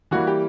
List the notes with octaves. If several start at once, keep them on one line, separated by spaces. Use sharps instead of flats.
E3 G3 A#3 F#4
G4